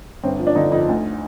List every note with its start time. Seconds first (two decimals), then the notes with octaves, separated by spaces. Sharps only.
0.23 G1 C4
0.39 F3
0.47 D4
0.56 D3 D#4
0.72 F2 D#4
0.89 D2